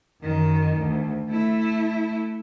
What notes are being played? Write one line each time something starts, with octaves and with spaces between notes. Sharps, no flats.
F#2 D#3
D2
A3 E4